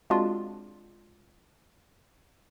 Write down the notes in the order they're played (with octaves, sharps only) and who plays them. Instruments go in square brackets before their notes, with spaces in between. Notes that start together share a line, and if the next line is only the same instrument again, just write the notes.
[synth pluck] G#3 C4 D4 F4 F#4